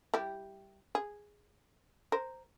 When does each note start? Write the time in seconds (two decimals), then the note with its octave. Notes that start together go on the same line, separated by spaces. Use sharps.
0.14 G3 E4 G4
0.95 G#4
2.12 A#4 C5